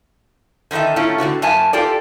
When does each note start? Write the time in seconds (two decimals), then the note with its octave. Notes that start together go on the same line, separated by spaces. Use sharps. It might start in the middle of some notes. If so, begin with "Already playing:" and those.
0.71 D3 D#3 D#4 A4 E5
0.96 A2 A3 A#3 C#4 F4
1.18 A2 D3 B3 F#4
1.42 F#2 A#3 E5 G#5 A5
1.73 F4 G4 A4 D5